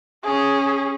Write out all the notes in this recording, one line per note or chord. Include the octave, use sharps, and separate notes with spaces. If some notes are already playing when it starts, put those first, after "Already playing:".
C#4 G#4